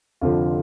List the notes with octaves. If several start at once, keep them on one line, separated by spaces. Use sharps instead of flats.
F1 F2 D3 F3 F4